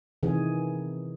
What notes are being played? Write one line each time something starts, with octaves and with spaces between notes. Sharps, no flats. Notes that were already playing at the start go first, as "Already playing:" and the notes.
C3 D#3 E3 G#4